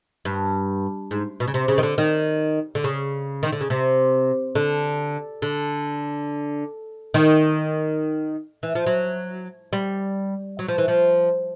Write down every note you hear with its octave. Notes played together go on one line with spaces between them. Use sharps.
G2
G#2
B2
C#3
C3
C#3
D#3
D3
D#3
D3
C#3
D#3
D3
C#3
C3
D3
D3
D#3
E3
F3
F#3
G3
F#3
F3
E3
F3